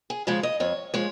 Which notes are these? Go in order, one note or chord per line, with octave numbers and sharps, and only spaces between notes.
G#4
C#3 F3 G#3 C#5
D#5
F2 C#5
F3 G#3 C#5